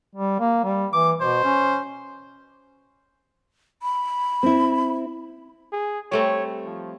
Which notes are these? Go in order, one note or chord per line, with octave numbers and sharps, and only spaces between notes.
G3
A#3
G3
E3 D6
B2 C5
C#4
B5
C4 E4
G#4
G3 A3 C4 C#5
F3